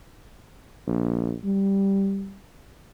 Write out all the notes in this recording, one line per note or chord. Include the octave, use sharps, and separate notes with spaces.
A#1
G3